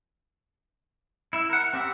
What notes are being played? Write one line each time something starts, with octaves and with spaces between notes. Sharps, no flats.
E4 E5
A#4 F#5
C4 G4 E5 F#5